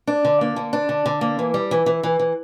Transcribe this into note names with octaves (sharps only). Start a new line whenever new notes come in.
D4
D3
A#3
D3
D4
D3
D3
A#3
E3
G3
E3
E3
E3
E3